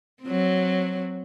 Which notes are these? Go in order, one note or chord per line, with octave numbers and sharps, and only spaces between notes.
F#3 C4